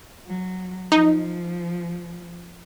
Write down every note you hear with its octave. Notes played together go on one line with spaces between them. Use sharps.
F#3
F3 D#4